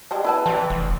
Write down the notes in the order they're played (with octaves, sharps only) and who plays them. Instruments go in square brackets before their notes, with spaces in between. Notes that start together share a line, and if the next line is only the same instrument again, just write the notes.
[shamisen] G3 G#3 D4
E4 B4 A5
[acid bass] E3 [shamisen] C4 C#5 D5
[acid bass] F1